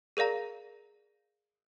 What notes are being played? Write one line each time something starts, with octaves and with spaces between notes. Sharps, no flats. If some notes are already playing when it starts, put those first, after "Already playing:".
G#4 A#4 D5 F5 A#5